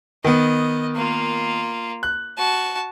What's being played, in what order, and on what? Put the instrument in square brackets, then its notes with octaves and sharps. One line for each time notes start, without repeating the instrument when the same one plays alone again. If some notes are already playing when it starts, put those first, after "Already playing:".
[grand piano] D#3 B3 [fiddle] D#5
[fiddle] A#3 F4
[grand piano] F#6
[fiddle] F#4 A5